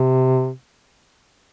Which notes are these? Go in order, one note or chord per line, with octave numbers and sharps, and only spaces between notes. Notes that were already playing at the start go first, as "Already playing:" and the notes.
Already playing: C3